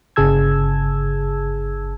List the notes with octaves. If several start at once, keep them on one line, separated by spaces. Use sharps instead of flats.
G1 C#3 G#4 A5 E6 G#6